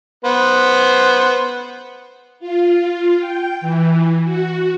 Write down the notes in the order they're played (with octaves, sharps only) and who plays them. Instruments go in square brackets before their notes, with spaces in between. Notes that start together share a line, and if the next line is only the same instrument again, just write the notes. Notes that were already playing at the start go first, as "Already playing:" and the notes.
[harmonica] B3 C5
[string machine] F4
G5
E3
F#4